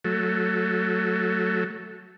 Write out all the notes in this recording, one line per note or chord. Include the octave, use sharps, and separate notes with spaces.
F#3 A3